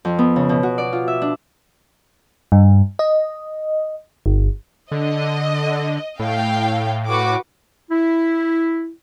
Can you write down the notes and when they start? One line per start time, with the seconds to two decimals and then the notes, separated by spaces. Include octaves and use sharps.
0.05 F2
0.19 B3
0.36 C#3
0.49 B2
0.63 F#4
0.78 D5
0.93 F4
1.08 E5
1.22 D4
2.52 G2
2.99 D#5
4.26 G1
4.92 D3 D#5
6.20 A2 F5 G5
7.07 F#4 B4 D6
7.90 E4